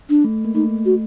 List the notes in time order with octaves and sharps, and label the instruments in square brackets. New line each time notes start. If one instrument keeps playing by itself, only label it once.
[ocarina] D4
[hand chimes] A3
A#3
[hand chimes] A3 [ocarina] D#4
[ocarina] F#4